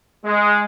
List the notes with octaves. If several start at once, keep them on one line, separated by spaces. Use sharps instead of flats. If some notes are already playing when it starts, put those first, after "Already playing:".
G#3